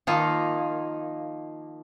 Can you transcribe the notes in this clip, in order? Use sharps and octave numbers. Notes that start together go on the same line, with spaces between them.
D#3 F3 A#3 D#4 F4